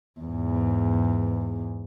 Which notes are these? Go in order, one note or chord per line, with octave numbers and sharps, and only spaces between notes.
E2 G#2